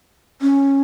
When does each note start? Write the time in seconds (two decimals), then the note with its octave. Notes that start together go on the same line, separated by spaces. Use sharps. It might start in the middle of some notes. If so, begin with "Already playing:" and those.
0.41 C#4